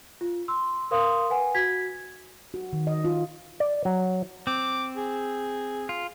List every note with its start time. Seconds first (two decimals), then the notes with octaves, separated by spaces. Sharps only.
0.21 F4
0.48 C6 E6
0.91 A#4 C5 F5 C6 D#6
1.30 B4 F#5 G#5
1.55 F#4 G#6 B6
2.54 F#4
2.73 D#3
2.87 D#5
3.04 F4
3.60 D5
3.85 F#3
4.47 C4 D6
4.97 G#4
5.89 F4